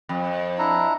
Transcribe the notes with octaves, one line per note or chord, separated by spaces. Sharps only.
F2
D4 E4 A#5